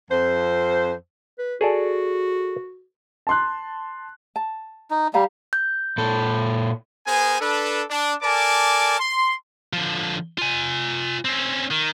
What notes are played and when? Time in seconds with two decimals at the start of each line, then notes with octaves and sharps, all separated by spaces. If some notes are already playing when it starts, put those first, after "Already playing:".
0.11 F2 C5
1.39 B4
1.61 F#4 G#4 A4 D5
3.27 A5 C6 F#6
4.36 A5
4.91 D#4
5.14 G3 G4 F5 A#5
5.53 G6
5.98 A#2 A4
7.07 B3 G#4 A#4 C5 G#5
7.40 D4 A4 B4
7.90 D4
8.23 A4 A#4 D5 G#5 A5 D6
9.00 C6
9.73 D3 F3
10.38 F4 G#5
11.25 C4 C#4
11.71 D#3